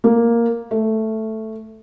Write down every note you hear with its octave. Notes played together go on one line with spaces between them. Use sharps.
A#3
A3